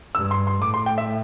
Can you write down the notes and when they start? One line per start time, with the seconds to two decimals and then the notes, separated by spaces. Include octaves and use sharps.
0.15 G2 E6
0.31 C6
0.47 C6
0.62 A2 D6
0.74 C6
0.86 G5
0.98 E5